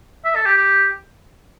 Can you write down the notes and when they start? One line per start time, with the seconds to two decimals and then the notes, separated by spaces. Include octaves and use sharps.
0.25 E5
0.36 A4
0.46 G4
0.57 G4